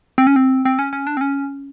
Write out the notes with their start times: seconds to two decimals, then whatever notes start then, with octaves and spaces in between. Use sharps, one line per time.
0.18 C4
0.27 C#4
0.36 C4
0.65 C4
0.79 C#4
0.93 C#4
1.07 D4
1.17 C4
1.21 C#4